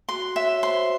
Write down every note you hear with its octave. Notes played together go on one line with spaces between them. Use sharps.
F#4 C6
C#5 E5
C5 C6